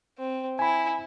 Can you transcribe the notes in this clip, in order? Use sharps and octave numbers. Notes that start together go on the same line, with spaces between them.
C4
E4 G#5 B5